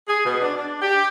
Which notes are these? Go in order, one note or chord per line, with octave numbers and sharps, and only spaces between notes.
G#4
B2
D4
D4
G4